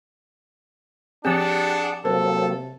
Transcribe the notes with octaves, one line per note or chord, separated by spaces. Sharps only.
F3 C4 D4 G4 G#4 F#5 A5
C3 F#3 A#3 C4 A4 A#4 C5